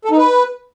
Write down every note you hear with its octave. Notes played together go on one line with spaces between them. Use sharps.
A4
D#4
B4